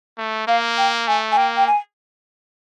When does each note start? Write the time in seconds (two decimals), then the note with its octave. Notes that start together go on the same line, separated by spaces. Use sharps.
0.17 A3
0.47 A#3 F5
0.78 G5
1.07 A3 G#5
1.32 G#5
1.37 A#3 G5
1.57 G5
1.67 G#5